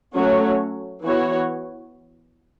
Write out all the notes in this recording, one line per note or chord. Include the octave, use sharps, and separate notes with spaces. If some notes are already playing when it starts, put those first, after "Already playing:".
F#3 A3 C#4 F#4 C#5
E3 B3 F#4 C#5